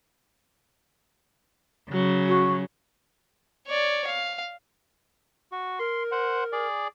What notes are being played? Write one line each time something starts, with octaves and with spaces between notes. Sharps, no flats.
C#3 F#3
F#4
C#5 D5
F5
F#4
A#4 C6
C5 F#5
G#4 D5